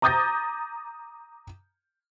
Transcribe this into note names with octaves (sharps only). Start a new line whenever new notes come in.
A#5 D6 D#6 G6 A6 A#6